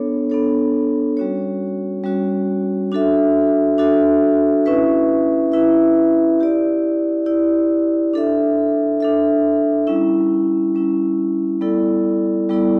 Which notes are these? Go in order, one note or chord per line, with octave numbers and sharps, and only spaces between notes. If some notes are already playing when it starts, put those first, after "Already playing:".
Already playing: B3 D4 A4 C#5
B3 D4 A4 C#5
G3 C#4 F#4 C#5
G3 C#4 F#4 C#5
D4 F#4 A4 E5
D4 F#4 A4 E5
C#4 E4 B4 E5
C#4 E4 B4 E5
E4 G4 D5
E4 G4 D5
D4 A4 E5
D4 A4 E5
G3 C#4 E4
G3 C#4 E4
G3 B3 E4 A4 D5
G3 B3 E4 A4 D5